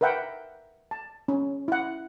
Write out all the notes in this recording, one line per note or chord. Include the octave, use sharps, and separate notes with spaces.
A#4 B4 E5 F#5 G5
A5
C#4
E4 F#5